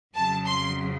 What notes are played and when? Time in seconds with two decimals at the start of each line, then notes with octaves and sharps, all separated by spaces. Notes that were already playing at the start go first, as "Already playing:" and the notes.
0.16 F2 C#3 F#3 A5
0.47 C6